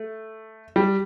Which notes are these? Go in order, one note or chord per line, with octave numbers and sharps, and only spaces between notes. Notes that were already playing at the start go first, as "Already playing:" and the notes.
Already playing: A3
G3